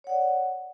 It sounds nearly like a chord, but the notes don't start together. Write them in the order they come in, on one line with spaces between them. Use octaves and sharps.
C#5 F#5 D5